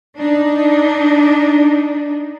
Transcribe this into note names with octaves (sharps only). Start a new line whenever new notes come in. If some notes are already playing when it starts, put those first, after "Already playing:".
D4 D#4